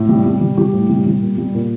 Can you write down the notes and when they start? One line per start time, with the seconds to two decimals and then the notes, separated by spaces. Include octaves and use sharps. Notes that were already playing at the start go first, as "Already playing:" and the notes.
Already playing: A2
0.09 G3
0.26 G3
0.41 G3
0.57 G3 G4
0.73 A2
0.89 G3
1.06 G3
1.22 A#2
1.38 G3
1.55 A#2